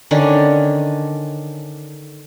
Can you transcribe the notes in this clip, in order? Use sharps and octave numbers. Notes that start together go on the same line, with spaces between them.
D3 D#3 C#4 D4